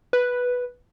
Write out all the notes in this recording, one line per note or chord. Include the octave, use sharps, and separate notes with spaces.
B4